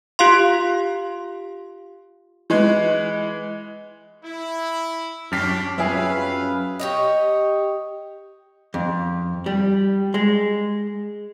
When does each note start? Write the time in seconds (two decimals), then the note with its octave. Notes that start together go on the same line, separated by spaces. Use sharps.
0.19 F4 G4 F5 C6
2.50 E3 G#3
4.24 E4
5.32 F#2 C#4 D4 G4 F6 B6 C7
5.78 F#2 C#4 F4 G#4 B4 E5 F5 G5
6.79 G4 C#5 D#5
8.74 F2
9.46 G3
10.14 G#3